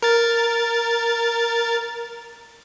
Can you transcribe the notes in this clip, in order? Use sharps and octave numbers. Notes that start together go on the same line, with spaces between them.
A#4 A6